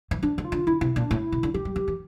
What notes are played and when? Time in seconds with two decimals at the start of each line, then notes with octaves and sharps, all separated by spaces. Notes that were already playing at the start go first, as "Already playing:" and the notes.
0.11 E3
0.23 F3 D4
0.38 D3
0.45 F4
0.52 D3
0.67 D3 E4
0.81 C3 E4
0.96 A#2 D4
1.11 A2 E4
1.32 C3
1.43 D3
1.54 E3 G4
1.65 G3
1.76 E3
1.88 E3